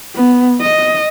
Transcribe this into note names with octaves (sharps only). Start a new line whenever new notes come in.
B3
D#5